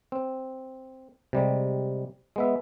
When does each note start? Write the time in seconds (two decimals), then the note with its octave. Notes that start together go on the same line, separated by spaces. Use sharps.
0.12 C4
1.33 C3 G3 G#3
2.36 G#3 B3 E5